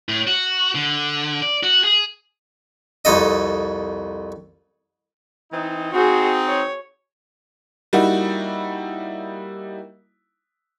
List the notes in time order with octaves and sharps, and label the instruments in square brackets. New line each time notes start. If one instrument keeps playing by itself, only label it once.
[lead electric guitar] A2
F#4
D3
D5
F#4
G#4
[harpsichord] C2 F2 A4 D#5
[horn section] E3 C4 D#4
[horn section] C4 D#4 [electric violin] F#4 G#4
[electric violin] C#5
[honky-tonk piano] G3 A#3 D#4 E4 F#4